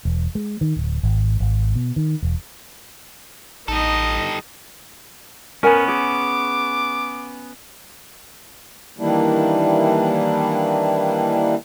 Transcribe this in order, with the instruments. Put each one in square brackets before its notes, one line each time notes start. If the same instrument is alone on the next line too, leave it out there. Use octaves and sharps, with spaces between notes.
[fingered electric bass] E1
G#3
D#3
D1
G#1
G#1
B2
D#3
E1
[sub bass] A1 [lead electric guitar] G3 A4 [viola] D#4 D#5
[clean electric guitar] B3 C#4 [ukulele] A#4 G#5
[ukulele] G#4 [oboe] D6
[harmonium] D#3 E3 G3 A#3 D4 E4